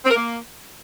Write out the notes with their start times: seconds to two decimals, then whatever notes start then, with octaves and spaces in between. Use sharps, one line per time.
0.05 C4
0.10 A#4
0.15 A#3